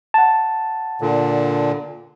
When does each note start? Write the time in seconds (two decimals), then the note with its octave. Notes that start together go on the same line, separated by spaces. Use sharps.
0.14 F#5 A5
1.01 A#2 D3